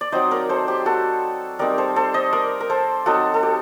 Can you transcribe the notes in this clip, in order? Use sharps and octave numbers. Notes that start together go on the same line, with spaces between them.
D5
F#3 C4 D#4 C5 D#5
A#4 D5
A4 C5
G4
F#4 A4
G3 C4 D#4 A#4 D5
A4 C5
A4 C5
C5 D#5
A#4 D5
A#4
A4 C5
F#3 C4 D#4 F#4 A4
A4
G4